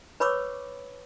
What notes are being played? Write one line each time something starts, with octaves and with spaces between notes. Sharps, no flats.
B4 C#5 B5 C#6 D6 E6